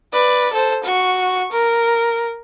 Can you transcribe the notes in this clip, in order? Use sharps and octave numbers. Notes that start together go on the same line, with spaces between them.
B4 D5
A4 C5
F#4 C#6
A#4